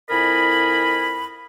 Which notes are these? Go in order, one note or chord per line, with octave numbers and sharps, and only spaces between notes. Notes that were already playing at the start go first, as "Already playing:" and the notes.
F2 E4 A#4 D#5 G#5 B5